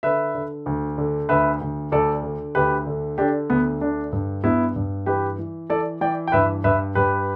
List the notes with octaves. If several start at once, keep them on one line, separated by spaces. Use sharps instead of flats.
D3 B4 E5
D3
D2
D3
D2 B4 E5
D2
D2 A4 D5
D3
D2 G4 B4
D3
D3 D4 G4
D2 B3
D3 D4
G2
G2 B3 E4
G2
E3 G4 B4
E3
E3 A4 D5
E3 D5 G5
G5
G2 B4 E5
G2 B4 E5
G2 G4 B4